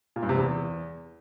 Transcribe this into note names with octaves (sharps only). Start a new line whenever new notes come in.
A#2
G2
C3
E2